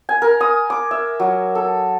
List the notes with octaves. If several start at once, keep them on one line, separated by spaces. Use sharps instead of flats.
G#5
A#4
D#6
D6
E5
F#3
A4